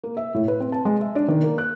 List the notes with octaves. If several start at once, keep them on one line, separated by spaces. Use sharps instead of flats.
A#3
E5
A2
B4
C4
A5
G#3
E5
D4
D#3
A#3
F#6